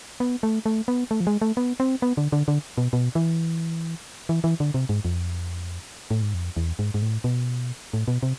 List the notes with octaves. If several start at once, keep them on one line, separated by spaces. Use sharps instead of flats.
B3
A3
A3
B3
A3
F3
G#3
A3
B3
C4
B3
D3
D3
D3
B2
B2
E3
E3
E3
D3
C3
G#2
F2
A2
G#2
F2
E2
G#2
G#2
A2
B2
A2
B2
C3